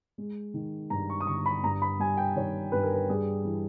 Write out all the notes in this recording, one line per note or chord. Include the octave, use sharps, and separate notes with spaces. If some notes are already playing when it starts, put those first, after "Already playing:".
G#3
D#3
G2 A#5
C#6
D#6
G1 C#6
B5
G2 A#5
B5
G3 G#5
G5
D#3 C#5
G2 B4
A#4
B4
G3 G#4
E3